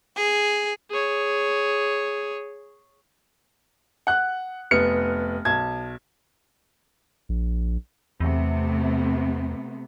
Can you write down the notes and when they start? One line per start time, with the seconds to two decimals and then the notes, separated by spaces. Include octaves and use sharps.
0.16 G#4
0.90 G#4 C#5
4.07 F#5 F#6
4.71 F1 B3 F6 C#7
5.45 B1 A5 G#6
7.29 A#1
8.20 E2 C3 A3 B3